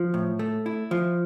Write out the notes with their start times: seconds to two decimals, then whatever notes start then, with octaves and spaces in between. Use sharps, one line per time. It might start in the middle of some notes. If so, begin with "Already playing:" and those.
Already playing: F3
0.14 A2
0.39 A3
0.66 E4
0.91 F3